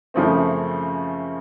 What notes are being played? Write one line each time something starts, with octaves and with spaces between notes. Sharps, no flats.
F#2 C#3 F3 A3 C4